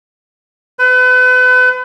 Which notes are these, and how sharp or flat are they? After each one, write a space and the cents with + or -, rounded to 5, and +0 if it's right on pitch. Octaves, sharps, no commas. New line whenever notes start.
B4 +35 B5 +40